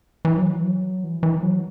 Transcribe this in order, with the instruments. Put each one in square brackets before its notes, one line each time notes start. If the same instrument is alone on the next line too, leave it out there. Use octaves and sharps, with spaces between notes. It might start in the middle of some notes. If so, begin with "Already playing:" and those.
[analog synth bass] E3
F#3
E3
F#3
E3
E3
F#3